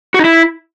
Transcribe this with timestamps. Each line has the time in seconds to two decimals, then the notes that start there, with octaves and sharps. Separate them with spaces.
0.14 F#4
0.19 D#4
0.24 E4